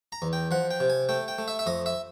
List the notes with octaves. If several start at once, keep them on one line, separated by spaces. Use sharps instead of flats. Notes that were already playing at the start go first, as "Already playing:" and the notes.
A#5
E2
G5
F3 F#5
G5
C3
G#5
A3 G5
G5
A3
E5
E5
F2 D#5
E5